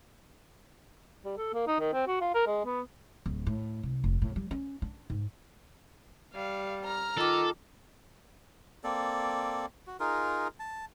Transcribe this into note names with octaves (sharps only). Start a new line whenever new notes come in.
G3
A4
A#3
D#4
D#3
C4
F#4
F4
A#4
G#3
B3
D1
A2
C2
F1
A2
G3
C#4
D4
G#2
G3 F5
A#5 F6
D#3 F4 A4 D6
A#3 C4 A4 D5
F#4
D#4 F4 G#4 A#4
A5